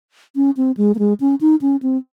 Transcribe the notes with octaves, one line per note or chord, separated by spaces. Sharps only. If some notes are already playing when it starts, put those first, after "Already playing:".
C#4
C4
G#3
A#3
G#3
C#4
D#4
C#4
C4